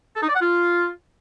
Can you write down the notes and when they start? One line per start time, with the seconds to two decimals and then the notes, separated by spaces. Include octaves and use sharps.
0.16 A4
0.22 D#4
0.29 D5
0.35 F#5
0.42 F4